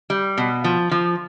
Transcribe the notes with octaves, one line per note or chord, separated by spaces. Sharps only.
G3
B2
F3
F3